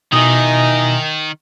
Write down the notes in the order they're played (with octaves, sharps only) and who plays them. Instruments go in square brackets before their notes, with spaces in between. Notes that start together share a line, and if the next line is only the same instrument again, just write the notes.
[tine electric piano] B2 [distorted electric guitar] D#3 [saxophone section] E3 D#4